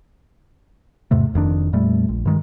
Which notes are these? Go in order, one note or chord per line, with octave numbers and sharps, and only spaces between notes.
E2 G#2 C3 A3
F1 F2 D#3 D4
F2 A#2 G3 A3
A#1
G2 D#3 G#3